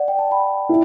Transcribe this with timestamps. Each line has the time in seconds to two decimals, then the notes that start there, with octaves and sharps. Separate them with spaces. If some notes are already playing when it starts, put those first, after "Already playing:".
Already playing: D5 F#5
0.08 G5
0.19 A5
0.31 G5 B5
0.69 E4